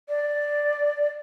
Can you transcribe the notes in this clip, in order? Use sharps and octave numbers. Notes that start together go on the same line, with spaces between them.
D5